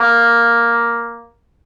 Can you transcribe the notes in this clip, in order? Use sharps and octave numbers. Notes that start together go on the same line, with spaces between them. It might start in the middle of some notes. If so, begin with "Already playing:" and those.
Already playing: A#3